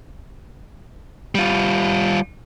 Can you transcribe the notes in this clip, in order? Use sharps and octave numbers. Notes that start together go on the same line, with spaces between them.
G3 F4